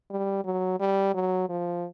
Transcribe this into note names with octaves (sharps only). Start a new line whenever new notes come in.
G3
F#3
G3
F#3
F3